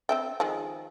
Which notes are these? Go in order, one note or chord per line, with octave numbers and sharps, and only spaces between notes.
C4 E5 G5
D#3 F3 G#3